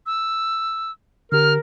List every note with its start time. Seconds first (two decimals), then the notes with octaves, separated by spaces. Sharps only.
0.06 E6
1.32 D3 G4 A#4 F6